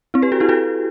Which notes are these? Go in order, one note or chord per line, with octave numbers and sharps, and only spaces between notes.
C4 E4
G4 B4
F#4 A4
E4 G4
F#4 A4